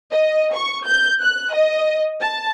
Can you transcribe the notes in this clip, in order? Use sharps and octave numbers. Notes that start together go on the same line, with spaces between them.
D#5
C#6
G6
F#6
D#5
A5